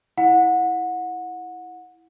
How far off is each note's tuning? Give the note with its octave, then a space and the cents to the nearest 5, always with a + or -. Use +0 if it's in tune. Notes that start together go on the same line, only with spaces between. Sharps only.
E4 -5 F#5 -25